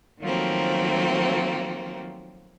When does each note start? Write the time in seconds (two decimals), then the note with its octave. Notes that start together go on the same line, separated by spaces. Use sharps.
0.21 D#3 F3 F#3 A3 A#3 C4